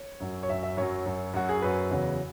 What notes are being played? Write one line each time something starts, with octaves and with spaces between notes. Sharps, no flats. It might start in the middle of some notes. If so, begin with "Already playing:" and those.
Already playing: C#5
F#2 F#3
C#5
F#2 F#3 E5
E5
F#2 F#3 C#5
F#2 F#3
F#2 F#3 F#4
G#4
F#2 F#3 B4
E2 C#3 F#3